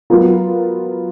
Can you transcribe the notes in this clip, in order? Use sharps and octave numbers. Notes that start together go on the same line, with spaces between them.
F#3 B3 F4 A#4